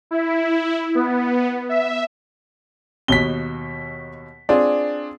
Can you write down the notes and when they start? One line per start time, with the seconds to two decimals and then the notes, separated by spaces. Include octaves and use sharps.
0.11 E4
0.95 B3
1.69 E5
3.08 D#2 B2 B6 G7
4.49 C4 D4 F4 G#4